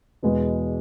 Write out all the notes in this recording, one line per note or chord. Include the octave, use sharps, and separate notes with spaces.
E2 B2 G#3 B3